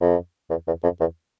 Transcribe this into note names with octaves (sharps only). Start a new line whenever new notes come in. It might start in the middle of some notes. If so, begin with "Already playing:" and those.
F2
E2
E2
F2
E2